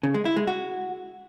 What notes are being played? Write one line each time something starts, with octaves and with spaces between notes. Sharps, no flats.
C#3
G#3
E4
G#3
F#4